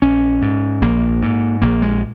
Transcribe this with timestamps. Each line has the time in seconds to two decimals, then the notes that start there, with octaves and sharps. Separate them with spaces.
0.02 A#1 C#4
0.42 G#2
0.82 A#1 A#3
1.22 G#2
1.62 A#1 A#3
1.82 G#3